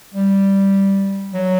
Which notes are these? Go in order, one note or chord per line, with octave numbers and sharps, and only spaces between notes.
G3
F#3